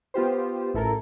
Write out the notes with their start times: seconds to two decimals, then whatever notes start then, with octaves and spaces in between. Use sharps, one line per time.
0.14 B3 F4 G4 C5
0.74 A1 E4 A4 A#4